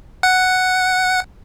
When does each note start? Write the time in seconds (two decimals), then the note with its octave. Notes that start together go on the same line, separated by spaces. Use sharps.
0.23 F#5